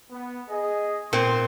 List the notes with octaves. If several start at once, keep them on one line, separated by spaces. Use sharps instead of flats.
B3
G#4 D#5
A#2 B3 C4 G5 C6